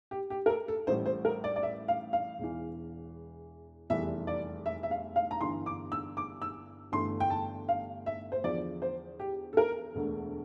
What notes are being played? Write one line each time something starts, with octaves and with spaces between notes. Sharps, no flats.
G4
G4
A#4
A4
A4
A1 A2 G3 C5
C5
A#4
D5
D5
E5
F5
F5
E1 E2 E3
F1 E2 E3 G3 E5
D5
E5
E5
F5
F5
A#5
G1 G2 E3 C6
D6
E6
D6
E6
G1 G2 E3 A3 C6
G5
A5
F5
E5
C5
E2 D3 F3 D5
C5
G4
A4
A#4
E1 D2 D3 A3